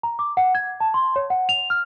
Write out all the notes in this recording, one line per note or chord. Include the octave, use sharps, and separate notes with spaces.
A#5
D6
F#5
G#6
A5
C6
C#5
F#5
F7
F6